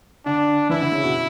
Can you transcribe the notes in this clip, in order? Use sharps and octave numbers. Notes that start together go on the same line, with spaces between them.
D3 D4
E3 E4
D3
C#3
B2